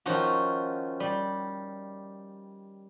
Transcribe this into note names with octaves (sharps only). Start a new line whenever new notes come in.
D#3 F3 C#4 F4 F#4
G3